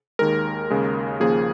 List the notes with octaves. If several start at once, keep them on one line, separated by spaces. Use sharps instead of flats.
D#2 D#3 G#3 A#4
D#2 C#3 G#3
D#2 C#3 F3 A#3 G#4